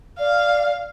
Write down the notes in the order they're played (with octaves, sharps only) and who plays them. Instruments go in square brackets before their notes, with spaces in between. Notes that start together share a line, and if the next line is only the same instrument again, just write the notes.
[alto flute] D5 [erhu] F5